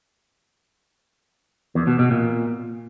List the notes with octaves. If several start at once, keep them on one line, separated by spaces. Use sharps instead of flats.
E2
B2
B2
A#2